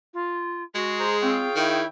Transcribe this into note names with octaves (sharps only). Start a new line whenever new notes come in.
F4
G#3 F#4 G#4
C5 A#5
C4 F4 C#5 G5
D#3 E4